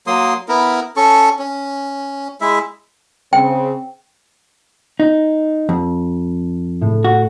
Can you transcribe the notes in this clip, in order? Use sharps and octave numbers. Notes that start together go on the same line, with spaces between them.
F#3 A#3 C6 D#6
B3 E4 A#4
C#4 A4 C#6
C#4
G#3 E4 E5
C#3 C4 G5
D#4
F2
A2
F#4